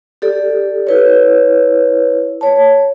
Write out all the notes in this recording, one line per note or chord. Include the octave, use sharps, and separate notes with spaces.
G4 A4 D5
E4 B4 C#5
C#5 A5